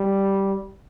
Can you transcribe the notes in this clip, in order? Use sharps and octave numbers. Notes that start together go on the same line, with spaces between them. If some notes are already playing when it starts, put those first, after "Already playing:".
Already playing: G3